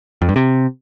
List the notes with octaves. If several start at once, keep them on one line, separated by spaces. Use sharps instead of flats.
F2
G2
C3